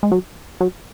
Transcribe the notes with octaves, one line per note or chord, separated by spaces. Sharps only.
G#3
F#3
F#3